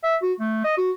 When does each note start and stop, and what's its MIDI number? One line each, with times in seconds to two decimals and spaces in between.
0.03 0.16 76
0.22 0.33 66
0.40 0.64 57
0.64 0.76 75
0.78 0.91 66